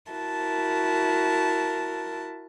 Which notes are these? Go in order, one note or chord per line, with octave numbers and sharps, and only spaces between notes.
E4 F#4 A#4 A5